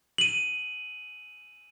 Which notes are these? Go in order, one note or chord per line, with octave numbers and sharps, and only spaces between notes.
D#7 F#7